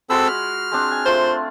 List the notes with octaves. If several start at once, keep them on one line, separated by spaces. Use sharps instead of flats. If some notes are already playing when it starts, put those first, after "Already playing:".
G#3 C4 F#4 A4 B5 E6
F6
G#3 C4 D4
G#5
A3 F4 C5